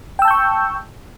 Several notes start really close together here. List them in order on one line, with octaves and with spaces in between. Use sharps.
G5 E6 A5 G6 C#6